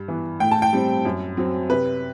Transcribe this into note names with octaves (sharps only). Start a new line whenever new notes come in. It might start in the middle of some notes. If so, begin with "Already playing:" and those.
Already playing: G2
E3 B3
A2 G5
A5
G5
G3 C4
F#2
F#3 C4
C3 B4